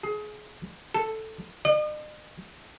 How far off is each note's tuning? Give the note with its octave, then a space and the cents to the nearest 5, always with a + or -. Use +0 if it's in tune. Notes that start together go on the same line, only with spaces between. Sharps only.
G#4 +25
A4 +0
D#5 -45